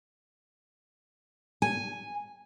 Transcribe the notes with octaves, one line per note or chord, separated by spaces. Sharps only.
G#5